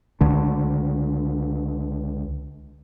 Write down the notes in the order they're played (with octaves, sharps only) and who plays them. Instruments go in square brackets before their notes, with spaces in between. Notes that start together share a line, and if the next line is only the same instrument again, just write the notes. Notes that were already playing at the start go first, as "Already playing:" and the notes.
[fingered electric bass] C#2 D3 D4